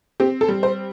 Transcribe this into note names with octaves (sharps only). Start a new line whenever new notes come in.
C4 G4
A4
G3
C5